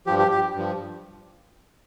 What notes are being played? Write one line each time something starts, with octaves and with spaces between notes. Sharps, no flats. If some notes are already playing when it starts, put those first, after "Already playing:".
G2 F3 G4
G4
G4
G2 F3